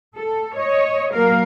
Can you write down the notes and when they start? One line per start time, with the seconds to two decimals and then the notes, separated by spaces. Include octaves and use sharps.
0.16 A4
0.57 C#5 D#5
1.13 F#3 A#3 A#4 F5